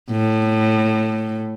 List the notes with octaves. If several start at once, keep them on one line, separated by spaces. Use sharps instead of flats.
A2